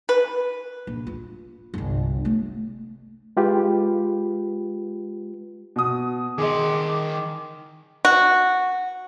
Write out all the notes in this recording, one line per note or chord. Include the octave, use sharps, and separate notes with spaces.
B4
A#1
F4
G1 C2
A3
G#3 F4 G4 B4
B2 D#6
D#3 G#4 D#5 C6 D6
F#4